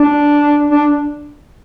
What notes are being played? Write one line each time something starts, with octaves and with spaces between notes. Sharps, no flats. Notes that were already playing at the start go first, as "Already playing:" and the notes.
Already playing: D4
D4